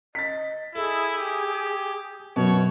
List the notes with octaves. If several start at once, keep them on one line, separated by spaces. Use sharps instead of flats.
D#5 A6 B6
E4 G#4 A4
G4
F#2 B2 C#5